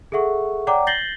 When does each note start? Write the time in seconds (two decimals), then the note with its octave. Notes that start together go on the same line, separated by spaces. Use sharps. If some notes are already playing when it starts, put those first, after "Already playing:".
0.12 G#4 A4 E5 F#5 C#6
0.67 C#5 D5 F#5 G5 A#5 D6
0.87 G6 A6 A#6 C7 F#7 G7